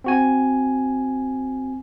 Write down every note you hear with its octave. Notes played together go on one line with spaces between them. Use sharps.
C4 F#4 G#5